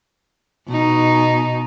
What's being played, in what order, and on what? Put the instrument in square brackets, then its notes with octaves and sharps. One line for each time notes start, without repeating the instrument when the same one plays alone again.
[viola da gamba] B2 D#4